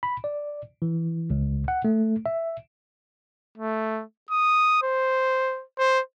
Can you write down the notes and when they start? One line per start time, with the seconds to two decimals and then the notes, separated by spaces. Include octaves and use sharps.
0.03 B5
0.24 D5
0.82 E3
1.30 C#2
1.68 F#5
1.85 A3
2.26 E5
3.58 A3
4.31 D#6
4.83 C5
5.78 C5